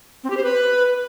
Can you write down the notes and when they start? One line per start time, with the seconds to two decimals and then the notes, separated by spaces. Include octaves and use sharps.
0.24 C4
0.30 G4
0.37 C5
0.43 B4